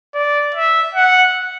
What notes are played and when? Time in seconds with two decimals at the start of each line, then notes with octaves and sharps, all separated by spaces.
0.14 D5
0.54 E5
0.94 F#5